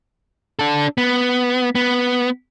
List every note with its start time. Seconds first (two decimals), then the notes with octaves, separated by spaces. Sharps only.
0.59 D4 A4
0.98 B3
1.75 B3